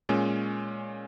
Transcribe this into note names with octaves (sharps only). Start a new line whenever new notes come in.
A#2 G#3 C#4